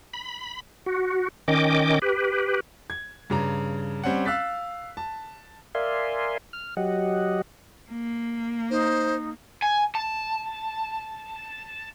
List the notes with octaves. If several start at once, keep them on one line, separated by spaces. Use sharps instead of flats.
B5
F#4
D#3 C#4 D#5 G5 D6
G4 B4
G#6
G2 C#3 A#5
G3 C4 C#4 F#5
F5 E6 F#6 A6 B6
A5
A#4 D5 E5 F5 G#5 C6
F6
F#3 G4 D#5 F#5
A#3
D#4 C5
G#5
A5